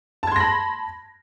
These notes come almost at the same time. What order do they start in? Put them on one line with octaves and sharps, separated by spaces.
A5 G#6 C6 A#6 B5